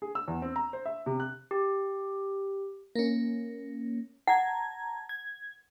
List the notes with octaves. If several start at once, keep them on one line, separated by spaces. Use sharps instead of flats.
G#4
E6
E2
C4
A#5
C5
E5
C3
F#6
G4
A#3 C#4
F#5 A5 A#5 G#6
G#6